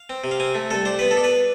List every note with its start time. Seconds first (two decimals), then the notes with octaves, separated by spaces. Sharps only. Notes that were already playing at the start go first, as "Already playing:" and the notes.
Already playing: F5
0.10 C4
0.24 C3
0.31 F5
0.40 C4 G#5
0.55 A3
0.71 C2 A4
0.85 D4 C5
0.99 B3 B4
1.11 A4
1.17 D4
1.24 B4